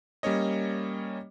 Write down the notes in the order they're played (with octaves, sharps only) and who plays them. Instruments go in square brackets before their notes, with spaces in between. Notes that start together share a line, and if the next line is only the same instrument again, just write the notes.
[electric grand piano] G3 A#3 C#4 C#5 D#5